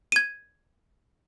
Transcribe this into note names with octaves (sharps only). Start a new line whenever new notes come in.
G#6 D#7